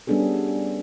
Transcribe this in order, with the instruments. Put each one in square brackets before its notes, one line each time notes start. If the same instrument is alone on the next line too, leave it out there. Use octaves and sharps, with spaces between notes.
[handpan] G3 B3 C#4 D4 G#4 A4